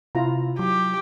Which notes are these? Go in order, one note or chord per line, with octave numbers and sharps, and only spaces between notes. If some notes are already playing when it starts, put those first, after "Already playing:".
C3 E4 F4 A#5
F#3 G4